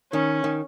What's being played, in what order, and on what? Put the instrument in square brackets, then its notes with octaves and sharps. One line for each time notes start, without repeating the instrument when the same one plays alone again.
[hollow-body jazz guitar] D#3 [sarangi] C#4
[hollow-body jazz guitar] D#3